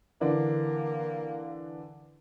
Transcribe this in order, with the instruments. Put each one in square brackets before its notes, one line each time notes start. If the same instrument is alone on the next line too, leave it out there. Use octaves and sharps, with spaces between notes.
[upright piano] D3 E3 D4 [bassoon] A#3